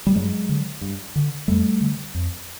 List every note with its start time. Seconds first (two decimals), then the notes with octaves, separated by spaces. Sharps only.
0.07 G3
0.15 G2 F#3 G#3
0.49 D3
0.81 G2
1.16 D3
1.48 F2 G3 A3
1.81 D3
2.14 F2